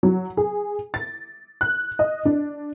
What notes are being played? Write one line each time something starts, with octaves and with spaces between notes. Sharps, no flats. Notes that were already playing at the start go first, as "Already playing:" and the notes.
F#3
G#4
A6
F#6
D#5
D4